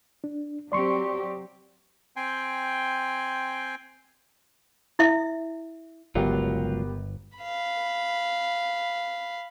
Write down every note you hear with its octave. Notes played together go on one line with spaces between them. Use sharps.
D4
F#3 C4 G4 D5 C6 C#6
C4 G5 G#5 C6
E4 E5
G1 C#2 F#3 B3 F4 G4 A#4
F5 B5